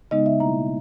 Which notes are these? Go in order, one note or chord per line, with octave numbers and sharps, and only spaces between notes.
C#3 G#3 B3 D#4 D#5
E5
B2 G3 A#3 E4 A#5